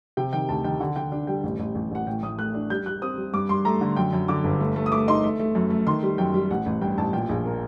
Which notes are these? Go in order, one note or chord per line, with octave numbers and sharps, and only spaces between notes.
C3 G5
D#3 G5
D2 A5
D#3 G5
D3 F#5
D3 G5
D4
G3 G5
A1
A1
A1
A1 F#5
A2 G5
A2 D#6
A3 F#6
D4
G3 G6
G3 F#6
C4 D#6
G3
G2 D6
G2 C6
A3 A#5
D3
F#2 G5
F#2
D3 D6
G1
A3
A3
D#6
A3 D6
D#4 C6
A3
A3
F#2
A3
D#3 C6
G3
F#2 G5
G3
A1 F#5
A1
G2 G5
A1 A5
A#2 G5
A#1
A#3